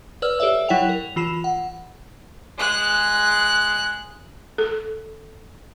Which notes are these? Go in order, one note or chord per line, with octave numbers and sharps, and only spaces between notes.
B4 D5 E6 F6
G4 A4 C#5 D5 E5 E6
F#3 E4 C#5 F#5 G5 F7
A#4 F7
E3 F4 B5 E7
F#5
G#3 F#6
A4